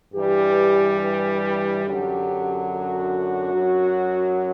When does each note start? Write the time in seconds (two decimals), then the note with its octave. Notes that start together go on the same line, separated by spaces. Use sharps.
0.14 G2 E3 G3 G4
0.99 G4
1.42 G4
1.84 F#2 D3 F#3
2.69 F#4
3.53 F#2 F#3